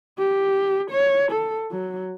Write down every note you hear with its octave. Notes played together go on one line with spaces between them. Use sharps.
G4
C#5
A4
F#3